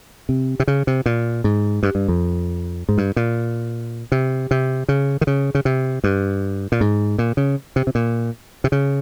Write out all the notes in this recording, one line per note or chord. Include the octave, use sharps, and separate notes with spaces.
C3
C3
C#3
C3
A#2
G#2
G2
G2
F2
G#2
G2
A#2
C3
C3
C#3
D#3
C#3
C#3
C3
G2
A#2
G#2
A#2
C#3
C3
C3
A#2
C3
C#3